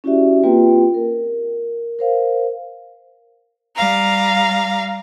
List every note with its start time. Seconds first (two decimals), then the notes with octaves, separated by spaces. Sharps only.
0.04 C#4 E4 F#4 G4 D5 E5
0.43 A#3 C4 F4 G4 B4 G5
0.94 A#4
1.99 A#4 C5 F5
3.76 G3 F5 A#5